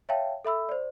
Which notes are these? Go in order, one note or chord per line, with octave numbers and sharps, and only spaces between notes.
C#5 E5 F5 G5 A5
A4 E5 B5 E6
C5 D5